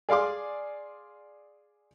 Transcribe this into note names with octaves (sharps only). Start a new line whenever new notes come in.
G#4 D5 F5 C6 D6